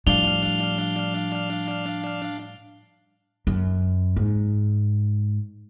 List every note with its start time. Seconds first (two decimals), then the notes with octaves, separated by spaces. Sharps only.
0.07 A2 F3 G3 D4 F5 F7 G7
3.47 F#2
4.16 G#2